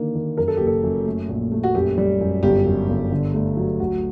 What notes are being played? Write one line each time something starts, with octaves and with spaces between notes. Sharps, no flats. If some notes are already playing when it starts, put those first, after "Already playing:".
Already playing: D3 D#3 A#3
D#3
F#2 A#4
A4
F#1 G4
A4
F#2
A3
A#1
A3
F#4
F#2 G4
G3
F#2
G1 G4
F#2
G1
D3
A3
F#3
D2 F#4